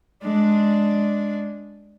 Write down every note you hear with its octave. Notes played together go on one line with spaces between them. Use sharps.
G#3 D4